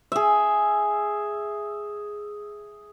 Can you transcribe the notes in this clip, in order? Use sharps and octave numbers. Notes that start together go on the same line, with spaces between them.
G#4 E5